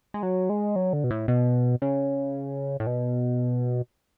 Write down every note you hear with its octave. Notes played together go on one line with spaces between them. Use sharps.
G#3
F#3
G#3
F#3
D3
B2
A2
B2
C#3
A2
B2